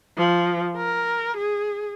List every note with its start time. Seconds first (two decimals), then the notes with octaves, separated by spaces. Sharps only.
0.18 F3
0.77 A#4
1.37 G#4